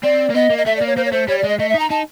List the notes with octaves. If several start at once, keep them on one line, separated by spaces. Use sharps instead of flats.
C4 D5
A#3
B3 D#5
A#3
D#5
A3 E5
D5
A#3
C#5
A#3 C5
C#5
A3 C5
G3 C#5
D5
G#3 D#5
A3 D#5
E5
D#4
A#5
D#4 A5